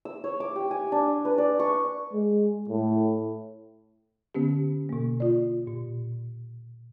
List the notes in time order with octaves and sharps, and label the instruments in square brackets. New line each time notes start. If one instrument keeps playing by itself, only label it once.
[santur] E6
C#5
D6
G4
G#5
D4
B4
D5
C#6
[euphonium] G#3
A2
[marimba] D3 B3 C#4 G4
B2 A#3
F4 D5
A#2